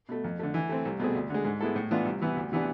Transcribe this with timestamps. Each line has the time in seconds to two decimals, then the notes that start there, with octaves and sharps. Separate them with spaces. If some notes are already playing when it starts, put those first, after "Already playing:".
0.09 B2 A3
0.24 F2
0.39 D3 A3
0.54 E3
0.69 A3 C4
0.85 C2
0.99 B2 A3 C4 G#4
1.15 D2
1.30 D3 G#3
1.45 G#2
1.61 G#3 B3 E4 A4
1.76 A2
1.91 E3 B3 D4 F4
2.05 C2
2.21 C3 E3 B3
2.36 D2
2.52 C3 E3 B3 D4